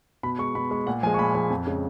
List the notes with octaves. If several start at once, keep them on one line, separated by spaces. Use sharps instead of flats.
B2 B5
G#3 C#6
B2 B5
G#3 C#6
A#2 F#5
F3 G#3 G#5
C#6
A#2 B5
F3 G#3 B5
F2
C#3 G#3